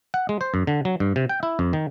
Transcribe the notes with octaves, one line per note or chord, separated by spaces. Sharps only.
F#5
G#3
C5
F#2
D3
F#3
G2
C3
G5
E4
F2
D#3